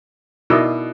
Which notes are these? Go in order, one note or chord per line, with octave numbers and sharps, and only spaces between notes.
B2 D#4 E4 F#4 A#4 D5 D#5